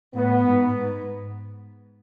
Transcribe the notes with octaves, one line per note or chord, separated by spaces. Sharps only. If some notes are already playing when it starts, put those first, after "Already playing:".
A2 B3
G#2
G#2